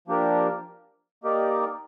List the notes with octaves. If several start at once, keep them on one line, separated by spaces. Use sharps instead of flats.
F3 A#3 D4 G4 A#4
A#3 D#4 G4 A#4 D5